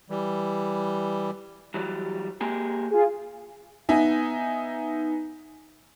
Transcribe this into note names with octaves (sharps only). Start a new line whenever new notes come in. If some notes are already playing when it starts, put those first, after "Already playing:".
E3 G3
E3 F#3 G3
A#3 G4 G#4
F4 G#4
B3 D#4 E5 G#5